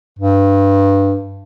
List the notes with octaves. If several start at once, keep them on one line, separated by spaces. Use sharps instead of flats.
G2